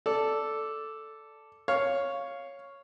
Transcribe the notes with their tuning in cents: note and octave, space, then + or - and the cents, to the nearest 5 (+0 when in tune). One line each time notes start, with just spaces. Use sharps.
A4 +0 D5 -5
C#5 +0 F5 +0